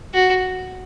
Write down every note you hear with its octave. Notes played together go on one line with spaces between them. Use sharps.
F#4